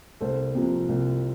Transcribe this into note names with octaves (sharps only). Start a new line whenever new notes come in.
C2 A4 C5
C3 F3 A#3
C2